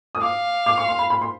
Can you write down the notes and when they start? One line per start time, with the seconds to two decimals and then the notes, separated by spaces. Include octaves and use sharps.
0.15 D#6
0.22 F5 D6
0.66 D6
0.78 C#6
0.88 C6
0.99 B5
1.10 B5
1.21 C6